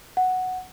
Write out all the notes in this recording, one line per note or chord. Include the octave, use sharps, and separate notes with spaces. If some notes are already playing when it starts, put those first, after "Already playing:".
F#5